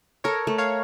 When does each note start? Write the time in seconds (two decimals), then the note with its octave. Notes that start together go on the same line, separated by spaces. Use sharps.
0.24 A4 A#4 C#5
0.47 A3
0.58 C#5 F5